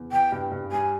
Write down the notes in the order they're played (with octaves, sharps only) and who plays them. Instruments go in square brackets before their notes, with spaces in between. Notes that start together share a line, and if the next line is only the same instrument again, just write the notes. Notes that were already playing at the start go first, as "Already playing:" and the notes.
Already playing: [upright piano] E2
[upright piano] E3 [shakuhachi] G5
[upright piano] G2
G2
[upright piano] G3 [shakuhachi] G#5